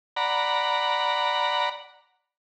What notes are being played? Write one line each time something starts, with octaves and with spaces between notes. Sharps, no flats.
D5 F#5 A#5 B5